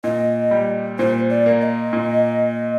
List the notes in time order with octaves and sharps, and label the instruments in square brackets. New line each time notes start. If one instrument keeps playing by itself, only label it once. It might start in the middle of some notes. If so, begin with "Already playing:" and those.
[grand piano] A#2 [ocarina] D#5
[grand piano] G3
[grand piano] A#2 [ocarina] C5
[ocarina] D5
[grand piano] A#3
[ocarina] D#5
[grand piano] A#2